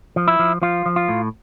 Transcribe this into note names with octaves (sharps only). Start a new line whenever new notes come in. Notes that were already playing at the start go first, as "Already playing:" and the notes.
F3
E4
F3
F3 F4
F3
F4
A2